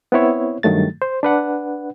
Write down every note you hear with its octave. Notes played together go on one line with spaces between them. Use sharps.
B3 C4 E4 C#5
G2 D#3 F#3 A3 A6
C5
D4 B4 F#5